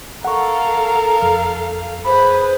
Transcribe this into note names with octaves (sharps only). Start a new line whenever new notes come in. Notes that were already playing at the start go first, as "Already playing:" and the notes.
A4 A#4 F5 F#5 C#6
F2
G#4 B4 C5 B5